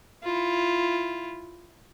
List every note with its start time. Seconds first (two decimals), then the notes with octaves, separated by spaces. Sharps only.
0.23 E4 F4